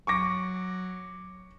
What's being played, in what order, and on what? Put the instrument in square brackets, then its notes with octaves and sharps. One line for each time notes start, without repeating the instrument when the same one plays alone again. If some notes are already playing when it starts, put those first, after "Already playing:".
[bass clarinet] F#3 [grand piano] C#6 D6 A#6